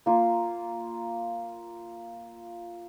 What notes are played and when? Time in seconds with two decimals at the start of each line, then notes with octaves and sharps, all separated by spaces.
0.06 A#3 F4